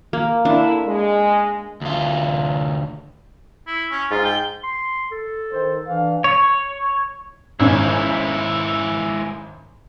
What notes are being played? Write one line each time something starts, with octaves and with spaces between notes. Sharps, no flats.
A#3
D3 A#3 D4 E4
G#3
D2 F4
E4
C#4
G#2 F4
G5 G7
C6
A4
D#3 C5
E3 D4 F5
C#5
G#1 G#3 C#4 E4